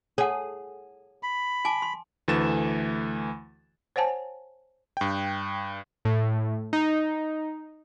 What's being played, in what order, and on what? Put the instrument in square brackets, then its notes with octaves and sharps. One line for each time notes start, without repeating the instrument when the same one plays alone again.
[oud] G#4 [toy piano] C#5 F#5
[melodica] B5
[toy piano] G#5 A5 D6
C6
[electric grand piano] D2 E3 A3 A6 E7
[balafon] C5 C#5 F#5 G#5 A5
[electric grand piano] G2 G5
[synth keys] A2
D#4